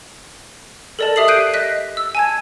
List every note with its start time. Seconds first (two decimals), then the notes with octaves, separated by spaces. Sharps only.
0.99 A4 A#4 D5 D#5 A5
1.16 G4 E5 D#6 C7 F#7
1.28 F#6 G6 C7 D7 D#7
1.54 D#5 F#6 B6
1.97 E6
2.15 G#5 A5 G#6